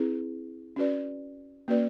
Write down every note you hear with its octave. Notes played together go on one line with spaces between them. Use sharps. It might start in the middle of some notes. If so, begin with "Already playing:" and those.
Already playing: C4 E4 G#4 B4
C#4 F#4 B4 D5
A#3 C#4 F#4 B4 D5